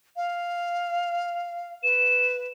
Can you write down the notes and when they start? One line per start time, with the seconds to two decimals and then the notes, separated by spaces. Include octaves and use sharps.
0.16 F5
1.83 B4 E7